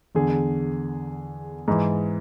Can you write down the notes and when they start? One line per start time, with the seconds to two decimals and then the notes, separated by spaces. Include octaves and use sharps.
0.15 E2 D3 G#4
1.68 G#2 E3